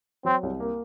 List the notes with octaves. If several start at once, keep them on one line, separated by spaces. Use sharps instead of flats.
F#3 C4
C2
A#3